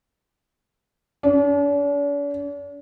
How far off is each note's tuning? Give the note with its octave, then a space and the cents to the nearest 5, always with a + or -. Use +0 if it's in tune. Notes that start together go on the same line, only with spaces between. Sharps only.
D4 -45